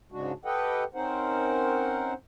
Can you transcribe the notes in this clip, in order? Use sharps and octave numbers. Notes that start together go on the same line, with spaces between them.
G#2 C#3 G#3 D4 F#4
G4 A4 B4 D#5 F#5 G5
C4 C#4 D#4 A#4 C5 F#5